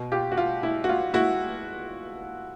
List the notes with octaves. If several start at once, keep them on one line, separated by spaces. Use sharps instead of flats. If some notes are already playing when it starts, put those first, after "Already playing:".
Already playing: B2
F4 G4
F#4
F4
E4
F#4
F4
E4 F#4